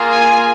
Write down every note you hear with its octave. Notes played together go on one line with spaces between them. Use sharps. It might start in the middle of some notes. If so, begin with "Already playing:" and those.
Already playing: A#3 F4 G#4
G#5